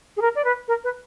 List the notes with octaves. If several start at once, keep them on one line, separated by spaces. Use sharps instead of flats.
G#4
A#4
D5
B4
A#4
B4